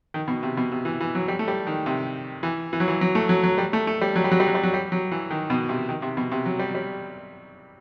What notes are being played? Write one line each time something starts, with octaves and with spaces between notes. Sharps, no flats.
D#3
B2
C3
B2
C3
E3
E3
F#3
G3
A3
G3
D#3
C3
E3
E3
F#3
E3
F#3
A3
F#3
F#3
G3
A3
A3
G3
F#3
G3
F#3
G3
F#3
G3
F#3
G3
F#3
E3
D#3
B2
C3
D#3
C3
B2
C3
F#3
G3
G3